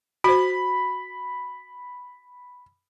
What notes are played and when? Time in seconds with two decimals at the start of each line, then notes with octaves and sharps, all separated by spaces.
0.24 F#4 C5 B5